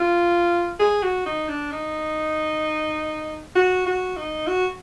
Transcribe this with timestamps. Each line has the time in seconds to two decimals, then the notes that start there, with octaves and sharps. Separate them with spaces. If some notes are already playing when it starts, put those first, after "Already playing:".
Already playing: F4
0.80 G#4
1.03 F#4
1.26 D#4
1.49 D4
1.72 D#4
3.56 F#4
3.86 F#4
4.17 D#4
4.47 F#4